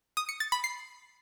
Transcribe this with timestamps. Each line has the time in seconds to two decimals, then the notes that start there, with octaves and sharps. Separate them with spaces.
0.17 D#6
0.29 C#7
0.40 A6
0.52 B5
0.64 C7